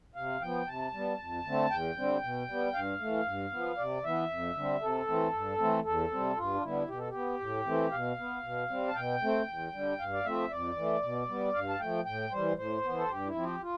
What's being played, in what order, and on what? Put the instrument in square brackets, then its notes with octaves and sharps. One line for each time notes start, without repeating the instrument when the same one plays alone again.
[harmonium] C3 F5
F3 B3 G5
C3 A5
G3 B3
F2
D3 A3 C4
E2 G5
D3 G3 C4
B2
G3 B3
G2 F5
E3 A3
G2
F3 B3
C3 D5
E3 B3 E5
F2
D3 G3 C4
C3 A4
E3 A3 C4
G2
E3 A3 C4
E2 A4
C3 G3 C4
G2 F4
D4
D3 G3 B3 E4
B2 G4
A4
G4
B3
A2
E3 A3 C4
B2 F5
B3
B2
G3 C4
A5
B2 G5
A3 C4
E2
D3 G3
G2 F5
D5
F3 A3 C4 E5
F2 D5
E3 A3
B2
G3 B3
G2 F5
A5
F3 A3 G5
A2 G5
E3 G3 C5
A2 C5
E3 B3
A4
G2 G4
E4
F3 C4
G4
F4